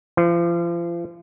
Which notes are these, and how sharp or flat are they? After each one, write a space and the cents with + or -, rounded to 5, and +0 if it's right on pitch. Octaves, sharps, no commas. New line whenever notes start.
F3 -35